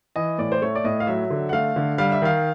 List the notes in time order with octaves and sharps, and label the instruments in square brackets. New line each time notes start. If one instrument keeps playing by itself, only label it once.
[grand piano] E3 D#5
A2 D5
C5
A3 C#5
D5
A2 D#5
F5
F#3 E5
D3
F#5
A3 F5
D3
G3 F5
E5
D#3 F5